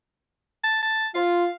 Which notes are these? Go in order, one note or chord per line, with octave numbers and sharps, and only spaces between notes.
A5
A5
F4 F5